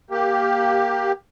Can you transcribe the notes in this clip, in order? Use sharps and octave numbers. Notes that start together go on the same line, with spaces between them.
A#3 G4